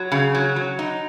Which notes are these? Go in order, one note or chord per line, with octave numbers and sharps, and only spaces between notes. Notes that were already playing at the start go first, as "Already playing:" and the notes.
Already playing: F#3
C#3
F#3
F#3
D#4